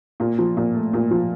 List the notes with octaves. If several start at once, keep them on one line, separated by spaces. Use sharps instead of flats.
A#2
F3
A#2
A3
A#2
F3